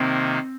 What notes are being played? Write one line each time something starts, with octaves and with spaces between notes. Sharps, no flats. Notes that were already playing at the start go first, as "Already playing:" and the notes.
Already playing: C3 D#3 A#3 C4